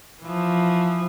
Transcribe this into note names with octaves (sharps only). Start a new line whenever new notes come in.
E3 F3